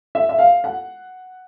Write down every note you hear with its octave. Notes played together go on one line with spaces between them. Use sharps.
E5
E5
F5
F#5